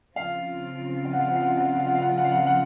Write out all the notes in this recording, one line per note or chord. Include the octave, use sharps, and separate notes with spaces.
C#3 F3 C4 F4 F5
F5
F#5
F5
F#5
F5
F#5
F5
F#5
F5
F#5
F5
F#5
F5
F#5
F5
F#5
F5
F#5
F5
F#5